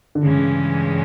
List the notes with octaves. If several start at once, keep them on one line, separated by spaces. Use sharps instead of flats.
D3
G2 C#3 E3 G#3 C#4